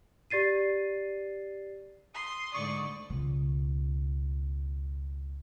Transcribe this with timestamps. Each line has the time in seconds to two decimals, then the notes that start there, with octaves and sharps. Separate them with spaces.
0.30 G4 D5 A6 C7 D#7
2.14 C6 D#6
2.54 G#2 D3 A3 D5 C#6
3.10 C#2 B2